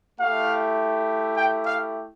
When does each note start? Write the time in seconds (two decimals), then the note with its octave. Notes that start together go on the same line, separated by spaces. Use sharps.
0.19 A3 E4 G4 F5
1.34 G5
1.64 F5